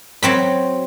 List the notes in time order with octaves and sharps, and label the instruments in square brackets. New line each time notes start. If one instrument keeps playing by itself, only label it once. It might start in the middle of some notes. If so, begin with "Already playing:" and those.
[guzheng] F#3 C4 B5